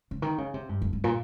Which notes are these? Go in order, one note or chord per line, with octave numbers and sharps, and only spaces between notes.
C#3
D#3
C#3
C3
G2
F2
G2
A#2